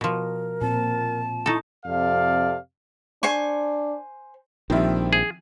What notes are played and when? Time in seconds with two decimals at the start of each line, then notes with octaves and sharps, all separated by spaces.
0.01 B2 F3 A#4
0.61 A#2 C4 A5
1.46 D#4 E4 A4 C#6
1.85 F2 C3 A4 D5 F5
3.23 D4 C5 G#5 C#6
4.70 A#1 D#3 F3 G3 C4 E4
5.13 G#4